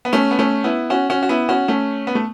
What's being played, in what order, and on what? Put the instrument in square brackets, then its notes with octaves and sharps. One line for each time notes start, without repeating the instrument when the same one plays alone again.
[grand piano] B3
A3 C#4
B3
A3 C#4
B3 E4
C#4 F#4
C#4 F#4
F#4
B3 E4
C#4 F#4
A3 C#4
B3
A3